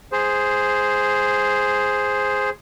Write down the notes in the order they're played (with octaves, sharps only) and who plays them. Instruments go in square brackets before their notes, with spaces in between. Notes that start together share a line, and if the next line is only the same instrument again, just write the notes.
[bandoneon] G#4 C5